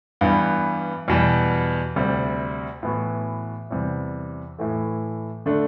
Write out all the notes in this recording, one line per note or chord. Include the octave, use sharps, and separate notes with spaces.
G2 E3 G3 B3
E2 B2 G3
D2 C3 G3
A2 E3 B3 F#4
E2 C3 G3
A2 E3 A3
D3 A3 D4